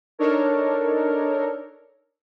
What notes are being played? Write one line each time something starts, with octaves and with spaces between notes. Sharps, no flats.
D4 D#4 A4 A#4 C#5